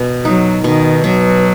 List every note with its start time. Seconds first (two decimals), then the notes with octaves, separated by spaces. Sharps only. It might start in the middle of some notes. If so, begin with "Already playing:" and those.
Already playing: B2 B3
0.25 F#3 D#4
0.64 B2 D#3
1.04 B2 F#3